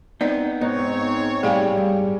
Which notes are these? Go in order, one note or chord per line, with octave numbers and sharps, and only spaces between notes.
B3 C4 D#4 D5
G#2 B3 C4 D#4 C#5
A2 G3 G#4 F5 G#5
G2